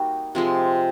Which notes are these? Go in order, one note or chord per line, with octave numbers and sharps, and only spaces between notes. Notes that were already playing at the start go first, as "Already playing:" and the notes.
Already playing: G3 A#3 D#4 F#4
C3 F3 G#3